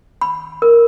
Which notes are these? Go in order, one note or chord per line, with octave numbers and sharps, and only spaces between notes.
B5
A#4